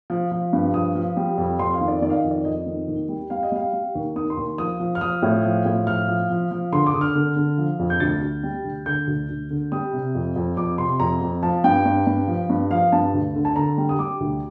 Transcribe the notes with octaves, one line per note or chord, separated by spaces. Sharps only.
F3
F3
G2
F3 D#6
F3
G3
F2
F2 C6
F5
D#3
D5
D#3 D5
F5
D#5
F2
D5
F2 D#5
D#3
D#2
G3
G3 F5
D#5
G3 F5
G3
D#2
D#3 D#6
C6
D#2
F3 D#6
F3
F6
F3 D#6
A2
F3
A2
F3 F6
F3
F3
F3
D3 C6
D6
D3 D#6
F6
D3
D3
F3
F2
G6
D2 A6
D2
G3
D2
D3 G6
D2
D2
D3
G3 D#6
C3
F2
F2
F2 D6
C3 C6
F2 A#5
F2
F3 A5
G2 G5
G2
G2
F3
G2
F3 F5
G2 A5
D2
D3
A5
D3 A#5
G3
D#6
G3 D6
D2